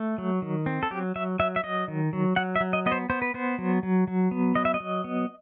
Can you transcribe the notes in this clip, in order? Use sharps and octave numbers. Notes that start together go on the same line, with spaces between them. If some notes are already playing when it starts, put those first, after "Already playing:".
Already playing: A3
F#3
D#3
C4
A4
F#3 G4
F#3 E5
F#3 E5
E5
F#3 D#5
D#3
F#3
F#3 F#5
E5
F#3
D#5
B3 D#5
C5
B3 C5
B4
B3 C5
F#3
F#3
F#3
B3
F#3 D#5
E5
D#5
F#3
B3